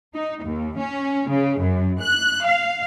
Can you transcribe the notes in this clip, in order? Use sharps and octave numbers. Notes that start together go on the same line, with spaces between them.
D#4
D#2
C#4
C#3
F#2
F#6
F5